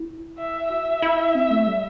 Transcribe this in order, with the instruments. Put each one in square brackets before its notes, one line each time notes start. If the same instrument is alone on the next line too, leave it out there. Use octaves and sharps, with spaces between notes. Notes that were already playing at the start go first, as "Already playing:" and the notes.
Already playing: [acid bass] E4
[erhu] E5
[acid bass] F#4 [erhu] E5
[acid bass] E4
C4
A3
G3